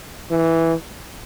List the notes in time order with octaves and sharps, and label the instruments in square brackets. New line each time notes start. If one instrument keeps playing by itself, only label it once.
[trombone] E3